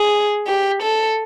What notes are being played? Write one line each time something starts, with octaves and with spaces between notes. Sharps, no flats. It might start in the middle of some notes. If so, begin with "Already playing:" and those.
Already playing: G#4
G4
A4